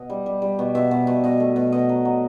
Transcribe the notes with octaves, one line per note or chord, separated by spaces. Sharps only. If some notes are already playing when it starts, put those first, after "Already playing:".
Already playing: B2 D#5
G3
G3
G3
B2
B2 E5
B2
B2
B2 D#5
A3
B2
B2 D#5
F#3
F#3